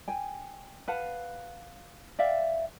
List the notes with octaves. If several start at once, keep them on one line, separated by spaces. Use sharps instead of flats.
G5 G#5
B4 F5 F#5 A5
D5 E5 F5 G5